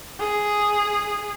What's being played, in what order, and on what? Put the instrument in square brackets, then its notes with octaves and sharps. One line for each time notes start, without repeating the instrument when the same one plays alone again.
[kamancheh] G#4